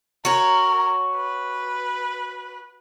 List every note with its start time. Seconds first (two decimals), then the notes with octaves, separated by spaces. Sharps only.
0.25 F#4 A#4 C#5
1.16 B4